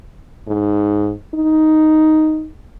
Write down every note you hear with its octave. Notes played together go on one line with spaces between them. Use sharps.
G#2
D#4